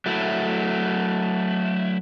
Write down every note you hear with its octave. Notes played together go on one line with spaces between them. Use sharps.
F#3 A3 E4